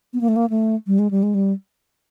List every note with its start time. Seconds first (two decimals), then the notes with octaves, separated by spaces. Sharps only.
0.13 B3
0.21 A#3
0.28 A3
0.36 A#3
0.50 A3
0.87 G3
0.99 G#3
1.11 G3
1.23 G#3
1.34 G3